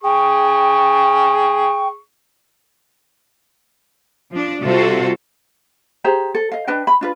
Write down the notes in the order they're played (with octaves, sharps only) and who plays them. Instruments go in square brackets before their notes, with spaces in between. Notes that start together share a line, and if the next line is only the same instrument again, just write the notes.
[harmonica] G#4 C#6 [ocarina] G5
[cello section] F3 D4
C3 G3 F4 F#4 A4 C5
[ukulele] G4 G#4 C5 A#5
A4
D#5 F5
D4 B4 D#5 G5
B5
D4 F4 B4